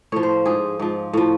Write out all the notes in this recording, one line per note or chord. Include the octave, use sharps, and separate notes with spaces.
A2 F3 C#5
C5
G#2 F3 G#4
G#2 F3
A2 F3